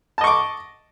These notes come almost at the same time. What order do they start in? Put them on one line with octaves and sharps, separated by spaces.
A5 D#5 C#6 D6